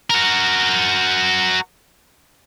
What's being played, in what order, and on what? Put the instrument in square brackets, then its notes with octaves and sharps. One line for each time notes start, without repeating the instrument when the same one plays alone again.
[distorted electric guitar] F#4 A#4